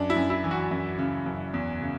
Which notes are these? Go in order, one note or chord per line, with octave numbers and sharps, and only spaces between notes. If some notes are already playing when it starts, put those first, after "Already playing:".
Already playing: F#2 D4
E4
F#2
E4
E3
F#4
F#2
C#3
F#2
E2
C#3